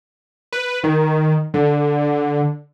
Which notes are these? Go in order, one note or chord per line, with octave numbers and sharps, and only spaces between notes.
B4
D#3
D3